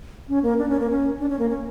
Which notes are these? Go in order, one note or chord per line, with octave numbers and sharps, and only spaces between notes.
C#4
A#3
D4
C#4
A#3
C#4
D4
C#4
A#3
C#4